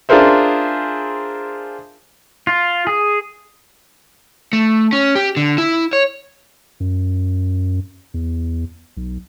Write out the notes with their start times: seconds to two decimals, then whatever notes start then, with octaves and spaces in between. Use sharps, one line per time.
0.09 D4 F4 G#4 A#4 C5 E5
2.47 F4
2.87 G#4
4.53 A3
4.93 C#4
5.15 G4
5.37 D3
5.58 E4
5.93 C#5
6.80 F#2
8.14 E2
8.97 B1